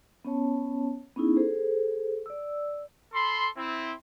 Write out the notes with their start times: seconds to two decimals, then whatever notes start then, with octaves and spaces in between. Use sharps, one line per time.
0.25 B3 C#4 C#5 A5
1.16 B3 C#4 D#4 E4 G#4
1.36 G#4 A4 C5
2.26 D5 E6
3.14 A4 B5 C6
3.56 C4 E4